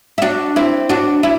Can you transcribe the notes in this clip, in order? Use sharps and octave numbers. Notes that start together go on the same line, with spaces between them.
E4
D4 F#4
C4 E4
D4 F#4
E4